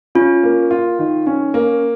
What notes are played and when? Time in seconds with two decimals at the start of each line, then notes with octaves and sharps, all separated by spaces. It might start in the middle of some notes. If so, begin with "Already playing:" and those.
0.15 C#4 F4
0.43 A#3
0.71 F4
0.99 D#3
1.27 C#4
1.54 A#3